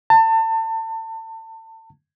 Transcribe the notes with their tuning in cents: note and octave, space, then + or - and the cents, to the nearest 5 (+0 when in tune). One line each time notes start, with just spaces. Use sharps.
A5 +30